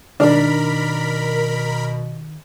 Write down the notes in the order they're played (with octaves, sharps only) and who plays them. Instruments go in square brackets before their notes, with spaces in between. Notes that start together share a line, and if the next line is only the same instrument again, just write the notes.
[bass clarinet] B2 [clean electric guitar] D#3 [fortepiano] D4 [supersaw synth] A#4 B5